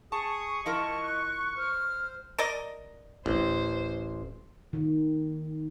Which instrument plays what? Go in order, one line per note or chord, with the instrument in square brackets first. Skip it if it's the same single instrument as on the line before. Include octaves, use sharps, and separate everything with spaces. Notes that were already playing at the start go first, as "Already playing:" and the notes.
[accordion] G#4 D#6 [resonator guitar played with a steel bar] A5 [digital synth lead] C#6
[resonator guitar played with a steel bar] F3 E4 A#4 [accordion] D#5 [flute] A5
[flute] F#6
[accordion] C5 [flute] F6
[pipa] A#4 D5 D#5
[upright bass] D1 D4 [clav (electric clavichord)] A1 [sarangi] C5
[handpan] D#3